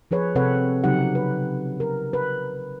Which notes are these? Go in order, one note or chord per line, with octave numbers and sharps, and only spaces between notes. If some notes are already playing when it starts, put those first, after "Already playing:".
F3 G#4 B4 C#5
C3 C4 A4 B4 C#5 F#5
C#3 F#3 D#4 G4 F#5
B4
A#4
B4